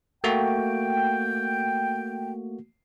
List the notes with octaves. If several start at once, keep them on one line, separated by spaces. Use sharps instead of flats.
A3 A#3 F#4 G5